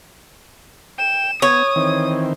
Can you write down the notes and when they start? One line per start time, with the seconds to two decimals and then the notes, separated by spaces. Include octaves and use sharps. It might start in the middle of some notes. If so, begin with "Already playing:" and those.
0.98 G5 E7
1.42 B3 C#5 D#6
1.76 D#3 E3 C4